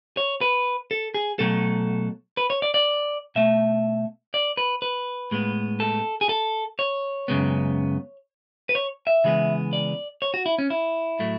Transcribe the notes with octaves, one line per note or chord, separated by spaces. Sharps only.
C#5
B4
A4
G#4
B2 F#3 A3 A4
B4
C#5
D5
D5
B2 A3 E5
D5
B4
B4
A2 G#3 B3
A4
G#4
A4
C#5
F#2 C#3 G#3 B3
B4
C#5
E5
C#3 E3 G#3 B3
D5
C#5
F#4
E4
C#4
E4
A2 F#3 A3